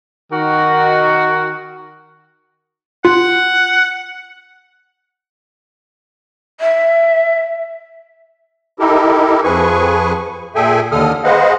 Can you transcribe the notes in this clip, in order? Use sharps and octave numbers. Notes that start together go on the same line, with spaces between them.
D#3 F#4
F4 F#5
E5
D#4 E4 G4 A4 A#4
F2 F3 G#4 B4 G#5 C#6
A#2 G#4 A4 E5 G5 G#5
D#2 D3 A4 D#6 F6
G#4 B4 C5 D#5 F5 F#5